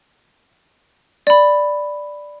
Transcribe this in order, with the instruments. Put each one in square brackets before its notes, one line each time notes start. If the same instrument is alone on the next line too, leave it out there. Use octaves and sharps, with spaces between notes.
[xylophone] D5 B5